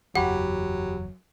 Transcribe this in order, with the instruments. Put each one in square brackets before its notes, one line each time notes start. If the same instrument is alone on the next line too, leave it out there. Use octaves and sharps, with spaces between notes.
[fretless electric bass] F#1 E2 E3 [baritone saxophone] F#3 [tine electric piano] G4 B5 [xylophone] F#5